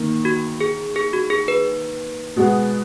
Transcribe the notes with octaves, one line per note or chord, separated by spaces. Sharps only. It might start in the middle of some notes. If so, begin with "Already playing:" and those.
Already playing: D#3 A#3
F#4
G#4
G#4
F#4
G#4
B4
B2 G#3 B3